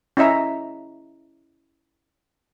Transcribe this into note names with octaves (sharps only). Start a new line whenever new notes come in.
C#4 E4 D#5 E5 A#5